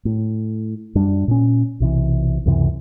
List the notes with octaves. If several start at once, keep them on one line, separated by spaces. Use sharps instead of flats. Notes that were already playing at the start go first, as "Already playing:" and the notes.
A2
F#2 G3 D4
A#2 C#4
B1 C3 E3
C#2 F#2 C3 E3